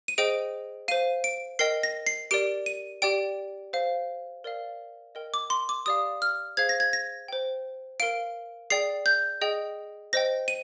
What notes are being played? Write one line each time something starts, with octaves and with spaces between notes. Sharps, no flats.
D#7
G#4 C5 D#5 G5 D7
C5 F5 D#7
D7
A#4 D#5 G5 C7
A#6
C7
G4 A#4 D5 D7
D#7
G4 D5 G5 D7
C5 F5
A#4 D5 F5
A#4 D#5 G5
D6
C6
D6
G4 D5 F5 D#6
F6
G#4 C5 F5 G#6
A#6
G#6
A#6
C5 G5
A#4 F5 D7
G#4 D5 G5 C7
G6
G#4 D#5 G5
C5 D#5 G5 A#6
D#7